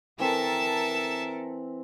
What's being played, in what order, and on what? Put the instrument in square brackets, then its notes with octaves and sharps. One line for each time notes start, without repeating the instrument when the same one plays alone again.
[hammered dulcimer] E3 C4 [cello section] A4 A#4 [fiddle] E5 A5